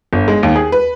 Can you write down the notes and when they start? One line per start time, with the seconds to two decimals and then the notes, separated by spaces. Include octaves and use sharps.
0.13 G1
0.28 G#3
0.43 D#2
0.56 G#4
0.72 B4